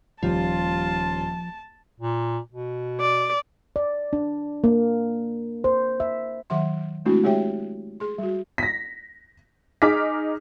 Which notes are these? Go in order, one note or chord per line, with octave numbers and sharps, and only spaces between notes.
D#1 F3 G3 F4 A5
A#2
B2
D5
D5
D4
A#3
C5
E5
D#3 F#3 E5 F#5 C6
G#3 A3 C4 D4 E4 F#4
G#3 G4 C#5 E5 G5
G#4 C6
G3 F#4
A#6 B6
D#4 G#4 D6 F6 B6